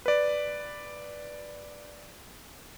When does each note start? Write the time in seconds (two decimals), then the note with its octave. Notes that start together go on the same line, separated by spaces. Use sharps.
0.06 B4 D5